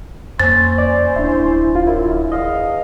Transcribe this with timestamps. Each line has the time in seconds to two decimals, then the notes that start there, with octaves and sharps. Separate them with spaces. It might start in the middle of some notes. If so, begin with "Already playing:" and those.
0.40 F2 A#3 C4 C#4 C5 A6
0.78 D5
1.16 D1 D4 E4
1.75 F4
1.87 F#2 E4
2.32 E2 D#5 F5